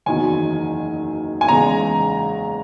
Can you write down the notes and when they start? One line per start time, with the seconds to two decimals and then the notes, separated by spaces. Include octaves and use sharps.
0.06 F#1 E2 D#3 F#3 G#5
1.41 G#5
1.48 E2 C#3 G#3 A#5